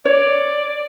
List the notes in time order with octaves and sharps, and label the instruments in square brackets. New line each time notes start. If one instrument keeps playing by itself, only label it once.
[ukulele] C#5 [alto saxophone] D5